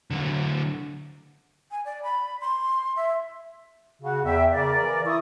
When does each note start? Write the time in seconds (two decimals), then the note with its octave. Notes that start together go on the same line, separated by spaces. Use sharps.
0.11 D3 F#3
1.71 G#5
1.85 D5
2.03 B5
2.41 C6
2.96 E5
4.02 C#3 F#4
4.24 E2 E5 G5
4.53 C#3 A#4 D5
4.80 E3
5.05 E4 C#6 D#6